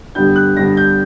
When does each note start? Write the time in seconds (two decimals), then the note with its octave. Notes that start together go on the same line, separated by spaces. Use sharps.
0.15 G2 D3 G3 B3 D4 G6
0.36 F#6
0.56 G2 D3 G3 B3 D4 A#6
0.77 G6